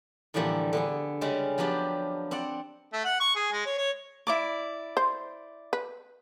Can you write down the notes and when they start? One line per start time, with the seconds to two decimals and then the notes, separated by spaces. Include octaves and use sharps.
0.34 A2 D3 E3 F3 G3 A#3
0.73 D3 B3 G#4
1.21 C#3 G3 G#3 C#4
1.58 F3 F#3 B3 D4 G4
2.31 C4 D5 F#5
2.93 A3
3.04 F#5
3.20 C#6
3.35 G#4
3.52 G#3
3.66 C#5
3.78 C#5
4.27 E4 D5 D6
4.97 C5
5.73 B4